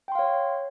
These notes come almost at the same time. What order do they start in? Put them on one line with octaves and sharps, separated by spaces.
G5 C6 F5 C#5